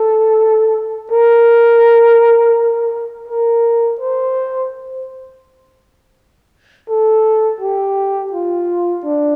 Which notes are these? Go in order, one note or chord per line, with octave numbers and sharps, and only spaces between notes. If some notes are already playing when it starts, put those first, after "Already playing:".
Already playing: A4
A#4
A#4
C5
A4
G4
F4
D4